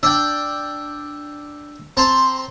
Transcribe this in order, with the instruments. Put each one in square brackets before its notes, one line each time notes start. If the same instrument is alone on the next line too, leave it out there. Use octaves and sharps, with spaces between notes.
[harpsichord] D4 G5 [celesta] E6
[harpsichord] C4 A5 A#5 [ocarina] C6